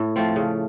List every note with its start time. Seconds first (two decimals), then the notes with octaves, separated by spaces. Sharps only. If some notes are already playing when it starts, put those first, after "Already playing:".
Already playing: A2
0.16 F3 A3 C4
0.36 C#3